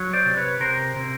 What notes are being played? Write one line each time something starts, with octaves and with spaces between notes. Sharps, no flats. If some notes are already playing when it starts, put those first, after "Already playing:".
Already playing: F#3
C5 D5
C3
B4 C#5
C3 A#4 C5
C3